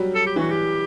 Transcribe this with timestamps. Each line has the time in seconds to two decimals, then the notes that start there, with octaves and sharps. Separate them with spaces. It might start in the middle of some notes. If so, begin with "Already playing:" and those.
Already playing: F#3 G3
0.15 A4
0.26 G4
0.36 E3 F#4
0.50 G4